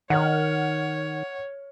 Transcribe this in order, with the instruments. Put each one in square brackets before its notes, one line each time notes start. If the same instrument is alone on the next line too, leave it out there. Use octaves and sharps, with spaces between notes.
[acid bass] D#3 [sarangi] C#5 [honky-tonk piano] F#5 F6